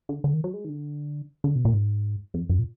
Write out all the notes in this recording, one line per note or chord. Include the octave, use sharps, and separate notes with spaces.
D3
D3
D#3
F#3
G#3
D#3
D3
D3
B2
A#2
G#2
F2
F#2
A#2